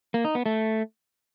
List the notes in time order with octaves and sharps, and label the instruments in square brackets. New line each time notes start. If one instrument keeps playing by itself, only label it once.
[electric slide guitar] A#3
D#4
B3
A3